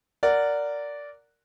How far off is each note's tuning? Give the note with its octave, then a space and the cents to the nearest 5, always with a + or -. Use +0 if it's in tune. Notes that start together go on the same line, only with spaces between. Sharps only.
A#4 -15 D5 -10 F#5 -5